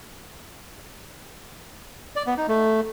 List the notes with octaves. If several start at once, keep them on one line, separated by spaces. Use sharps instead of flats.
D5
B3
D#4
A3